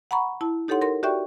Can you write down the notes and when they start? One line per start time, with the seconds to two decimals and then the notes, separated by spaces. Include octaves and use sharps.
0.11 F#5 A#5 B5 C#6
0.41 E4 A5
0.68 D#4 G4 A4 C#5 F#5 C6
0.82 A#4 C6
1.03 F#4 G4 D5 E5 G5 C#6